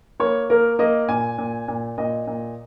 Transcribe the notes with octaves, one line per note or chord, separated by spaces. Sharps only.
A#3 C#5
A#3 A#4
A#3 D#5
A#2 G#5
A#2
A#2
A#2 D#5
A#2